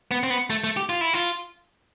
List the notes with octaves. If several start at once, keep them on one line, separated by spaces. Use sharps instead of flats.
B3
C4
B3
A3
A3
G4
F4
E4
F4